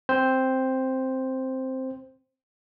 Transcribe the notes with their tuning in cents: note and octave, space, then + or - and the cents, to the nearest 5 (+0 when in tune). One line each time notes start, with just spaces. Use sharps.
C4 +0 C5 +0